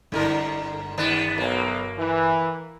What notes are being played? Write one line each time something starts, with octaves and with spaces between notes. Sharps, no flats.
G1 G#2 D3 A#4
D#2 B3 D4
B1 A#3
E3